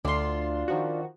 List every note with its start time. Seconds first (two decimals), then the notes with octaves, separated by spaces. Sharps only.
0.05 D2 D4 F4 C6
0.68 D#3 F3 F#4